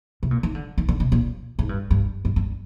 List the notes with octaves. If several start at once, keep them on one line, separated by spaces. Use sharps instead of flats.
C3
A#2
D#3
D3
D#3
D3
C3
A#2
G#2
G2
G2
G2
G2